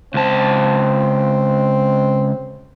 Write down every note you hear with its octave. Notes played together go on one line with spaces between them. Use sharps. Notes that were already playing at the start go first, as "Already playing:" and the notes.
C#2 C4 A5